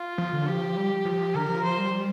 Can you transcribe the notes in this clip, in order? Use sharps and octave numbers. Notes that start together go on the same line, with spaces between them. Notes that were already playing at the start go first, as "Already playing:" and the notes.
Already playing: F4
F3
D3
F3 G4
G3
F3
D3 A#4
F3
F3 C5
G3